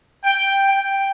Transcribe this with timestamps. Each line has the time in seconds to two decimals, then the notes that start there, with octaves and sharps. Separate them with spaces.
0.24 G5
0.67 G5